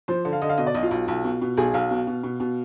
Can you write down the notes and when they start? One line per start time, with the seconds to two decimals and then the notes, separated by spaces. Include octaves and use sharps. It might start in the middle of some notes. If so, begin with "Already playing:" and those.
0.08 F3 C5
0.25 D3
0.33 F5
0.42 D3 D#5
0.50 F5
0.58 B2 D#5
0.67 D5
0.74 B1 D#5
0.83 F4
0.91 B1
1.08 B1
1.24 B2
1.41 B2
1.57 B1 G#4
1.74 B1 F5
1.90 B2
2.07 B2
2.23 B2
2.40 B2